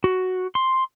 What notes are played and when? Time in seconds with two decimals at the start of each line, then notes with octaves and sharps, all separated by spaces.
0.04 F#4
0.55 C6